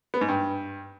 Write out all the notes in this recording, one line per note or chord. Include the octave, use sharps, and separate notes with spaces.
B3
G#2
G2